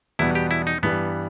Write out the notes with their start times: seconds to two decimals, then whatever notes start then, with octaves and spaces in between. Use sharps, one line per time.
0.19 E2 B2 G3 B3 E4
0.35 G4
0.51 E4
0.67 D#4
0.83 G2 E3 G3 B3